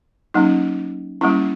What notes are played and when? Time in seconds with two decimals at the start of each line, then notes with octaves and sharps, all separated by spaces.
0.34 F#3 A#3 C#4 D#4
1.21 G3 A#3 C#4 E4